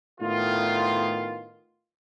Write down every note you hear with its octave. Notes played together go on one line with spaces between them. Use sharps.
A2 D#3 B3 F4